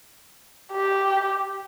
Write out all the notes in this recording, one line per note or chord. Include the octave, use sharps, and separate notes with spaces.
G4